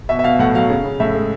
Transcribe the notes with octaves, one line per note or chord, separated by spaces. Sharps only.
B2 E5
E5
B2 F5
A2 F#5
F#3 F5
C#3
C#3
A2 E5
G#3